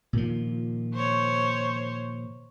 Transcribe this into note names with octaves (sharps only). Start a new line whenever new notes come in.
A#2 D#3 F3
C5 C#5